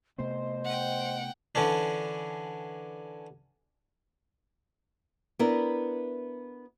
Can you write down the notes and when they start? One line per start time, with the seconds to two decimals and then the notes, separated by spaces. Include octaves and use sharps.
0.18 C3 A3 B3 C5 D#5
0.64 F#5 G5
1.55 D3 E3 C#4 D4
5.39 B3 D4 E4 A#4